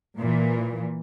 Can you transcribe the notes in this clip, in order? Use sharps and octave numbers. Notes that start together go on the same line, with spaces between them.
A#2 E3